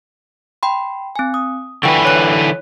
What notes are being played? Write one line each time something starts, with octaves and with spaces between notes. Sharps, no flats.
G5 B5 C6
C4 G#5
D#6
D3 E3 B4 G5 C#6
C#5 F#6